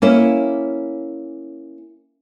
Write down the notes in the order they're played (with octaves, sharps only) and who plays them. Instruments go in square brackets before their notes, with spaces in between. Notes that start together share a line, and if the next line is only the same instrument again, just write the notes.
[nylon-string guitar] A#3 C#4 E4